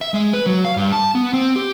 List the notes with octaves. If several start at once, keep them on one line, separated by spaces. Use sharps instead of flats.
E5
G#3
B4
F#3
F5
G2
A5
B3
C4
G4